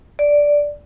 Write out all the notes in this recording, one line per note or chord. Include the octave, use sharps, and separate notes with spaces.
D5